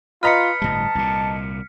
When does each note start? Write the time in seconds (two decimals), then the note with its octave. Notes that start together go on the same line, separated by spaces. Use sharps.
0.23 F4 B4 D#5 A#5 F6 B6 C#7
0.62 G1 A2 G3 A5
0.95 C2 A#2